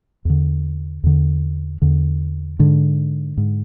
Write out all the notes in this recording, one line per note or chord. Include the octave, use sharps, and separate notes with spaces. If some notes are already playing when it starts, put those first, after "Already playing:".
E2 D3
E2 D3
E2 D3
G#2 D3
G#2